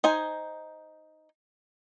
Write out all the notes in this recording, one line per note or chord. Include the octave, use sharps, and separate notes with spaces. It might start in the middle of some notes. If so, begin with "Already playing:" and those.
D#4 C5 G#5